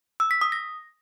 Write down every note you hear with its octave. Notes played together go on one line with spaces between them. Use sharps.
E6
B6
D#6
A#6